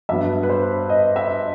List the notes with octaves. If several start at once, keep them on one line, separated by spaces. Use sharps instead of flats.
G2 F#3 B3 E5
B4
C5
D#5
E5